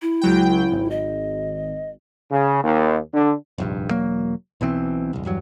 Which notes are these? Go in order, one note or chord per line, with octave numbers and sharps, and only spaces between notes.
E4
C#2 F#3 G5
G#1
D#5
C#3
D#2
D3
F1 A#1 G2
E1 F#3 A#3
B1 B2 E3 C4
E1 C2
E2 G2 F#3